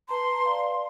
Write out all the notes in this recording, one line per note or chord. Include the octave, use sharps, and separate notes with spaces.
B4 A5 A#5 C6
D5 F5